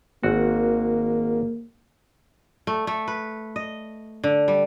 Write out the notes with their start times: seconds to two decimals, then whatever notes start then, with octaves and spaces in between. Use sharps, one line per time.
0.23 G#1 A#3 F#4
2.67 A3
2.87 A3
3.08 B4
3.56 D#5
4.24 D3
4.48 G3